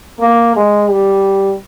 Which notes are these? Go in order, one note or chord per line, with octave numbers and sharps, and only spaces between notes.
A#3
G#3
G3